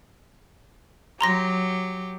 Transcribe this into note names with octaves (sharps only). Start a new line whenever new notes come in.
F#3 G4 A#5 C6 A#6